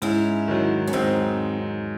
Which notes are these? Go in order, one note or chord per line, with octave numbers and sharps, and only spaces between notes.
G#2 C#4 E4
D#3 F#3
C#4
G#2 C4 D#4